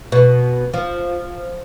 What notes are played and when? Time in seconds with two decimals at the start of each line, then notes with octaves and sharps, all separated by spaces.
0.12 B2
0.74 F3